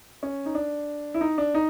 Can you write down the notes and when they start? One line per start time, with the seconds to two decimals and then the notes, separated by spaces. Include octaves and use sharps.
0.23 C#4
0.46 D#4
0.55 D4
1.14 E4
1.21 D#4
1.38 D4
1.54 D#4